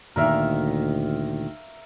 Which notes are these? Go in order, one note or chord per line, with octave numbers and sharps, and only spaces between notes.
D2 A#2 D#3 A#4 D5 E5 F5